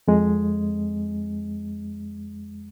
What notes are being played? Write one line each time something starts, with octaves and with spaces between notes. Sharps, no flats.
F2 G#3